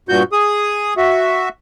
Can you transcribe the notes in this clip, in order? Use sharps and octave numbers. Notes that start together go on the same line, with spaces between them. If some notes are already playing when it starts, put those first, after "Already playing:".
G2 A#2 F#4 G6
G#4 D#6
F#4 E5